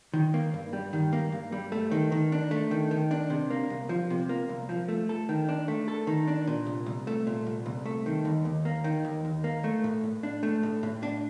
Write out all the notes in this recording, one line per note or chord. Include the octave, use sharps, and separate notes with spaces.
D#3
A#3
G2
G3
D#3
A#3
G2
G3
A3
D#3
D#3
D4
A3
D#3
D#3
D4
C3
A#3
C2
F3
C3
A#3
C2
F3
A3
A4
D#3
D4
A3
A4
D#3
D4
A#2
C2
C2
A3
A#2
C2
C2
A3
D#3
D#2
D#2
A#3
D#3
D#2
D#2
A#3
A3
A2
A2
D4
A3
A2
A2
D4